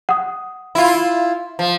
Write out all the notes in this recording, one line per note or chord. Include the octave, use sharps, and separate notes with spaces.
F#5 D#6
E4 F4
F3